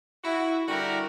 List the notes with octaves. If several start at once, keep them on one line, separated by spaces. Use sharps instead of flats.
E4 F#4
D3 G3 E4 F#4 G4 A#4